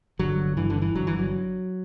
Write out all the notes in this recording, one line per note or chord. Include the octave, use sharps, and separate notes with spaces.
G1 G2 D3 F#3
G1 G2 D3 E3
D3
E3
G1 G2 D3 F#3
E3
F#3